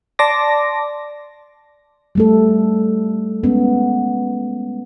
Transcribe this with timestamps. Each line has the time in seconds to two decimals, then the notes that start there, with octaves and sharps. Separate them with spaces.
0.19 D5 A5 C6 D6 A#6
2.15 G3 A3 A4
3.43 G#3 B3 C#4